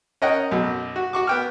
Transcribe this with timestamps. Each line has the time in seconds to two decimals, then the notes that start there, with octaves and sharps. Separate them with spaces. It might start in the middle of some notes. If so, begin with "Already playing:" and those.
0.22 C#4 A#4 D#5 F#5 G5
0.51 B1 F#2 B2
0.96 F#4
1.13 F#4 C#6 D6
1.27 B3 G5 F6